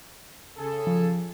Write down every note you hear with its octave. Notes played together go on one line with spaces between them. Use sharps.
C#3 G#4 A4
F3